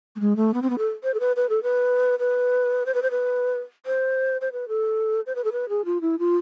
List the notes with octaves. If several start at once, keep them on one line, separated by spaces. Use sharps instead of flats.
A3
G#3
A3
B3
C4
B3
A4
C5
A4
B4
B4
A4
B4
B4
C5
B4
C5
B4
C5
C5
B4
A4
C5
B4
A4
B4
G#4
F4
E4
F4